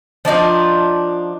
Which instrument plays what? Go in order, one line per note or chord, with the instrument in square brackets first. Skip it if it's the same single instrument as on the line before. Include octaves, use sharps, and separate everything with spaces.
[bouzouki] F3 D4 D#4 F4